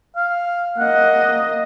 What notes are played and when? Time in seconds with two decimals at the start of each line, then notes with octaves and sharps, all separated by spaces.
0.16 F5
0.79 A#3 D#5 F#5